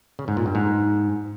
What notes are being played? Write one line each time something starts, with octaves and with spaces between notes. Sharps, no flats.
C#3
G#2
A#2
G2
G#2